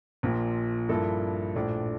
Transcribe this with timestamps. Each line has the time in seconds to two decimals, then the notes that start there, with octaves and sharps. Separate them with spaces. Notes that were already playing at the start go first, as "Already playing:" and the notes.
0.23 A#1 A#2 F3
0.89 G2 F3 A#3 E4 A4
1.55 A#1 A2 F3 A3 D4